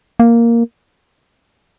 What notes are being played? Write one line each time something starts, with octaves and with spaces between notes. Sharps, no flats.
A#3